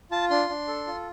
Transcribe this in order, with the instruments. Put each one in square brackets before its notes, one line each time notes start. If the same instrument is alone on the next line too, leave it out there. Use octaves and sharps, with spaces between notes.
[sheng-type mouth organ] F4 A5
D4 C6
D4
A4
F4